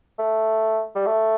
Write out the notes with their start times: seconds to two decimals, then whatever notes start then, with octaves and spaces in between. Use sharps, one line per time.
0.19 A3
0.95 G3
1.06 A3